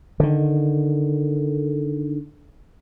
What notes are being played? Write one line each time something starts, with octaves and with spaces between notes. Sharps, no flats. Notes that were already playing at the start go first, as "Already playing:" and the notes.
D3 D#3